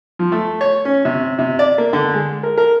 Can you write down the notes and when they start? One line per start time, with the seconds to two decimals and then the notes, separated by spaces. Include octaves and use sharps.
0.19 F3
0.32 A3
0.61 C#5
0.85 C#4
1.05 C3
1.39 C3
1.59 D5
1.78 A#3
1.93 D3
2.14 G#3
2.43 A#4
2.58 A#4